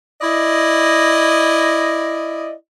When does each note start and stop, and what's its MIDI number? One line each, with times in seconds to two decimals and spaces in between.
0.22 2.53 64
0.22 2.53 74
0.22 2.53 75